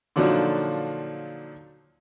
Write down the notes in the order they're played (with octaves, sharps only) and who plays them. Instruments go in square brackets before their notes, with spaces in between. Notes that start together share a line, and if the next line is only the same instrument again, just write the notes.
[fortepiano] A#2 D3 F3 F#3 D4 D#4